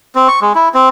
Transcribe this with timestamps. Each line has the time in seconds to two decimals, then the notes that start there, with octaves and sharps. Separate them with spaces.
0.15 C4
0.28 C#6
0.42 G#3
0.55 E4
0.74 C4